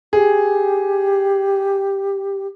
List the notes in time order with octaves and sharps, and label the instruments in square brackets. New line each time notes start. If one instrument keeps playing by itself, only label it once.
[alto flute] G4 [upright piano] G#4